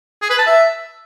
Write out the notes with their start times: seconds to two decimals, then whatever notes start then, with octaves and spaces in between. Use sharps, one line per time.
0.22 G#4
0.30 B4
0.38 A5
0.47 E5